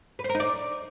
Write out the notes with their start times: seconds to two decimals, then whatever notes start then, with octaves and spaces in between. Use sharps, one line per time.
0.19 B4
0.24 C5
0.29 A#4
0.35 D#4
0.40 D5